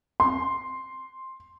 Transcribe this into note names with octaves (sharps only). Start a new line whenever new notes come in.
C6